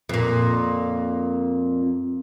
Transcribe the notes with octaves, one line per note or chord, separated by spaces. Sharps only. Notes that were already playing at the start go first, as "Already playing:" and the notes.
F2 A#2